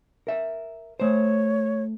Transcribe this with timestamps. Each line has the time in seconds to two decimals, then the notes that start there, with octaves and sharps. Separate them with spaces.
0.27 A#4 E5
1.00 A3 C5 C#5